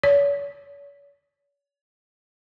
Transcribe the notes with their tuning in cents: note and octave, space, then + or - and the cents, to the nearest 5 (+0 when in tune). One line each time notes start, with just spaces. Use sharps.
C#5 +45